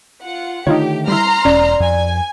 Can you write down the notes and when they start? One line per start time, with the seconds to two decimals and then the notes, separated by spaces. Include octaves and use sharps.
0.25 F4 F#5
0.67 D3 D#3 A3 D#4 F4 G4 C#5
1.08 G3 E4 A#5 C6 F6
1.45 E1 C#4 D5
1.80 F2 G#5 G#6